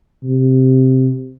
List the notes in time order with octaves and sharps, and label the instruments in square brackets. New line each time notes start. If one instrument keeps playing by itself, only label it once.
[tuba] C3